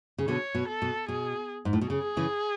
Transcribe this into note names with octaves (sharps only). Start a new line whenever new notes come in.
C#3
B2 D3 C#5
B2
A4
B2
B2 G#4
G#2
A2
B2
C#3 G#4
C#3 E3